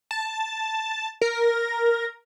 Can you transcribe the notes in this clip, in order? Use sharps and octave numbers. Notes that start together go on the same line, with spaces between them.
A5
A#4